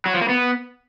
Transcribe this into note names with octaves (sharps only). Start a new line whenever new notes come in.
F#3
F3
A#3
B3